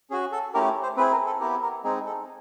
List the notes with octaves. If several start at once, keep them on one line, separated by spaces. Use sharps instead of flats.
C#4 F#4 G#4
A4
A3 C#4 E4 G4 A#4
C5
C4 E4 G#4 B4
A#4
A4
B3 E4 G4 A#4
A#4
G#3 C4 D#4 G#4
A4